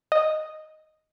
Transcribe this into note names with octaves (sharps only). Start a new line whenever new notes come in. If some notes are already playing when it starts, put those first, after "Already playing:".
D#5